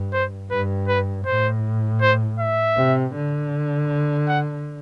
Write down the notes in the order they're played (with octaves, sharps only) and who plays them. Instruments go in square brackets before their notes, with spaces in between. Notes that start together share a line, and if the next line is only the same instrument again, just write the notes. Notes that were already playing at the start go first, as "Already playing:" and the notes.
Already playing: [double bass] G2
[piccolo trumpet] C5
[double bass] G2 [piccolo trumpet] B4
[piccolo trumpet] B4
[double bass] A2 [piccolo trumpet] C5
[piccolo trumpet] C5
E5
[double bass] C3
D3
[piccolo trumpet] F#5